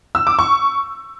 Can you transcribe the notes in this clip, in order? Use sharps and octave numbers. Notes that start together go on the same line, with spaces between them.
E6
D6
C#6